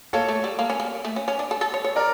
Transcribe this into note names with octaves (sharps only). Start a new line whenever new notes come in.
A#3 A4 C#5
A3
G3
A#3
C#4
A#3
A3
C#4
C#4
D4
A4
A4
C#5
C#5
A#4 D5